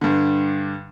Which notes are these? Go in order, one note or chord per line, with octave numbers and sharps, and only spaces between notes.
G2 D3